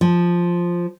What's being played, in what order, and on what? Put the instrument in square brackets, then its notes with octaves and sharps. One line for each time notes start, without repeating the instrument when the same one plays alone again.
[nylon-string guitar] F3